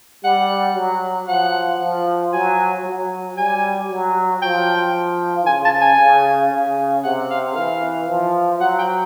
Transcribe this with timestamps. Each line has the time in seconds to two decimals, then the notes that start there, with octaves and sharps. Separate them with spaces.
0.24 G3 F#5
0.76 F#3
1.28 F3 F#5
1.80 F3
2.33 F#3 G#5
2.85 F#3
3.37 G3 G#5
3.90 F#3
4.42 F3 G5
5.46 C#3 G#5
5.65 A5
5.81 G#5
5.99 C#3
6.52 C#3
7.04 C3 F#5
7.30 F5
7.56 E3 F5
8.08 F3
8.61 F#3 F#5
8.79 G5